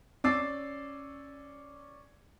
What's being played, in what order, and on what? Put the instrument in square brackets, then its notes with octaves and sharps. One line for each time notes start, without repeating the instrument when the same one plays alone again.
[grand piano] C#4 D5 D6 E6 A6 C7